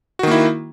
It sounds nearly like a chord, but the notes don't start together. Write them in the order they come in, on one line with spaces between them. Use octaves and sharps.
F#4 D#3 A#3 E4